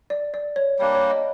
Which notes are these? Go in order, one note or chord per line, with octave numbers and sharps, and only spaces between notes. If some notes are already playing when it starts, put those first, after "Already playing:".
D5
D5
C#5
G3 A#3 D4 C#5
C#5
D#5